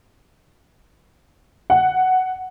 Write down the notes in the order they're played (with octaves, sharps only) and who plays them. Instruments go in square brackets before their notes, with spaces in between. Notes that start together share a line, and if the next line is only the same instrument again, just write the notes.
[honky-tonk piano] F#5